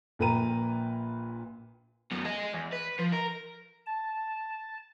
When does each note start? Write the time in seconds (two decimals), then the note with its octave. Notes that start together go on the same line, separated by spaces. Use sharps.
0.19 A#1 A#2 B4 G5 A#5 D#7
2.11 F#2 B3
2.25 G#4 D#5
2.53 E2
2.73 B4
2.99 F3
3.13 A#4
3.86 A5